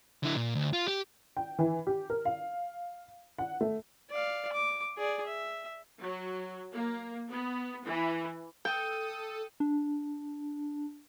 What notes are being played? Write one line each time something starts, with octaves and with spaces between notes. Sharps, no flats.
D3 E4
A#2
D2
F4
G4
G5
E3
G4
A#4
F5
F#5
A3
D5 F5
D6
G#4 D5
E5
F#3
A#3
B3
E3
A4 G5 D#6
D4